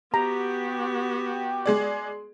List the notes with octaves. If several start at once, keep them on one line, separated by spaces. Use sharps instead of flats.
B3 F#4 G4 A#5
G#3 G#4 D5